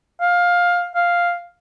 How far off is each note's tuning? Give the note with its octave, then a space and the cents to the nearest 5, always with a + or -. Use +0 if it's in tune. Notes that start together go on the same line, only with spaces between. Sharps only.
F5 +15
F5 +0